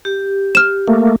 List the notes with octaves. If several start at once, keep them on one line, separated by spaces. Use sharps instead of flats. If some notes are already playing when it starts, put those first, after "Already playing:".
G4
F6 E7
A3 A#3